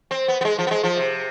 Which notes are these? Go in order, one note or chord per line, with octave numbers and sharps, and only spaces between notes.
C4
B3
B3
G#3
F3
B3
G#3
F3
C3